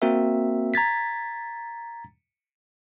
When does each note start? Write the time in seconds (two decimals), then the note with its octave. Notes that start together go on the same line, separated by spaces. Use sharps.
0.02 A#3 C4 F#4 A#4 E5
0.74 A#5 G#6 A6 B6